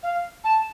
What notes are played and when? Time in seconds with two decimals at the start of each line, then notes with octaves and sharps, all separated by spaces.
0.03 F5
0.44 A5